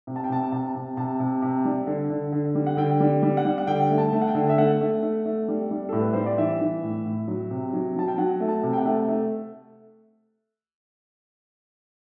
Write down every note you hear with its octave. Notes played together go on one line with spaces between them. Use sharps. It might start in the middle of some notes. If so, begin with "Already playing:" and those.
C3
A5
G5
C3 A5
C3 A5
C3
C3 A5
C3
C3
G3
D3
D3
D3
G3
F#5
D3 G5
G3
G3
F#5
G3
F#5
D3 G5
A3
A5
A3
F#5
G5
D3
E5
A3 F#5
A3
A3
A3
G3
G3
A2 A4
B4
G3 C5
D5
E3 E5
E3
A2
A2
F#3
C3
F#3
F#3 A5
G5
F#3 F#5
A3
A5
C3
G5
F#5
A3
A3